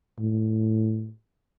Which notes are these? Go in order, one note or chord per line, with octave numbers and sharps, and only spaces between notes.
A2